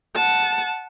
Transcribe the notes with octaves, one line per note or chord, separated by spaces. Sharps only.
F#5 A5